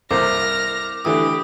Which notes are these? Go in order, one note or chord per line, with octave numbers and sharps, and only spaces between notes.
C2 A#3 C5 D6 F6 A#6
D3 E3 A3 G4 D#6